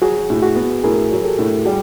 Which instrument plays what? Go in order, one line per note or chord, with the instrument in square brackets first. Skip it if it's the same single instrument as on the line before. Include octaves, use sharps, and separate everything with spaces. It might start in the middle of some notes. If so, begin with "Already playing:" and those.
[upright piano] F#3 [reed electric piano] F#4 G#4
[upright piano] A2
[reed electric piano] F#4 G#4
[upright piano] B3
[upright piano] A2 [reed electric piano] G#4 A#4
[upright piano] F#3
[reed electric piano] G4 A4
[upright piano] A2
[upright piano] G3 [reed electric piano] F#4 G#4